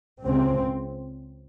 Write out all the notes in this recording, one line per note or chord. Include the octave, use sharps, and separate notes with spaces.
C#2 C#3 C4